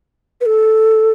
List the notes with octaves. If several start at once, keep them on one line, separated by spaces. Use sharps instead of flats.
B4
A4